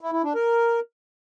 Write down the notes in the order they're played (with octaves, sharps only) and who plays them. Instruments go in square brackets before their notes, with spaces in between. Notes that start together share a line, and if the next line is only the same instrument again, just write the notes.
[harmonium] E4
E4
D4
A#4